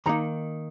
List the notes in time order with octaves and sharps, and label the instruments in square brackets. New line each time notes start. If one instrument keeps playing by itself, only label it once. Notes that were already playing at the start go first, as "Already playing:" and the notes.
[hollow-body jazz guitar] D#2 D#3 A#3 D#4 A#5